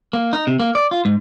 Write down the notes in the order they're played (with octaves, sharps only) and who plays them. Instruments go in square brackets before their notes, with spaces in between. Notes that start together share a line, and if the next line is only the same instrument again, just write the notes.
[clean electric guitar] A#3
D#4
C3
A#3
D5
F4
G#2